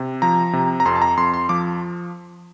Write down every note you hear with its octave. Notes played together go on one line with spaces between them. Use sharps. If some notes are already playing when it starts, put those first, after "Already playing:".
Already playing: C3
F3 A#5
C3
A#5
F2 C6
A5
A#5
F2 C6
C6
F3 D6